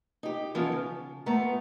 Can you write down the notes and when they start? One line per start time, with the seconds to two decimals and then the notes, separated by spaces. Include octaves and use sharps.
0.23 D#4 G4
0.55 E3 F3 B3 C#4 F4
0.72 C#3
1.26 A3 B3 F4 A#5